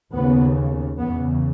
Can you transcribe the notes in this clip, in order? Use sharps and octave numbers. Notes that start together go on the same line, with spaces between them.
D#2 C#3 B3
E2 C#3 B3